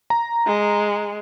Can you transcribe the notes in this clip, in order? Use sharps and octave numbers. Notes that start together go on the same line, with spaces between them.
A#5
G#3